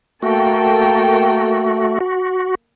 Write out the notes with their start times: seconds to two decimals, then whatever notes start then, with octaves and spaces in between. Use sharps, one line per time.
0.23 A3 A#3 F#4 A4 G5
2.00 F#4